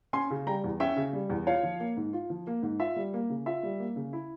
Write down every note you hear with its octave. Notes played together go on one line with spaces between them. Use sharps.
C#4 G#5 C6
C#3
G3 G5 A#5
E2
C#4 E5 G5
C#3
G3
E2
F4 C#5 F5
F3
A#3
G#2
F4
F3
A#3
G#2
F4 E5
G3
A#3
C#3
F4 E5
G3
A#3
C#3
E4